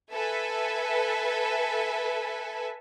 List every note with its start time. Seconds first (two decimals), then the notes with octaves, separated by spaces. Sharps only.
0.13 A4 B4 E5 G#5